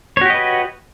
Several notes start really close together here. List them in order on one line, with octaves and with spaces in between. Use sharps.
C#5 F#4 G4 D#5 B4